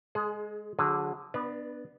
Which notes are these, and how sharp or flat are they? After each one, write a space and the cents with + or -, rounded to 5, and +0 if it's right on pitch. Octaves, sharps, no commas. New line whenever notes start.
G#3 +0 G#4 +30
D3 +0 F#3 -35 G#4 +0
B3 +0 D4 +20 B4 -35